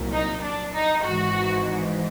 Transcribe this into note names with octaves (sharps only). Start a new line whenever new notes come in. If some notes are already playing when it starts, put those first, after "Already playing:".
Already playing: C2 A#2 F#3
D#4
D4
D#4
G#1 G#2 E3 F#4